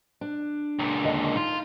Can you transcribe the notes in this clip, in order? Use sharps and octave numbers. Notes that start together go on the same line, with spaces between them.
D4
C#2 A#2
D#2 D3 D#5
D#4 F4